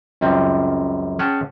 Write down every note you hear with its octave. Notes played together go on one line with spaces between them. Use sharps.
C#2 F#2 G3 C4
C#4 G#4 F#5 G5 A5